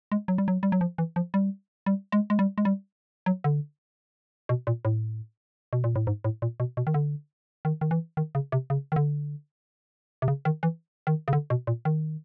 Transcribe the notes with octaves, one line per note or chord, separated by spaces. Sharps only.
G#3
F#3
G3
F#3
G3
F#3
F3
E3
F3
G3
G3
G#3
G#3
G3
G#3
G3
F#3
D3
B2
A#2
A2
B2
A#2
A2
G#2
A2
A#2
B2
B2
D#3
D3
D#3
D#3
E3
D#3
C#3
C3
C#3
D#3
D3
C3
C#3
D#3
E3
D#3
C#3
D3
B2
A#2
D#3